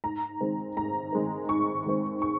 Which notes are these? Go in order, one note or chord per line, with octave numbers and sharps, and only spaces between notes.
G#2 A#5
D#3 G#3 C4
G#2 A#5
D#3 G#3 C4
G#2 C#6
D#3 G#3 C4
C#6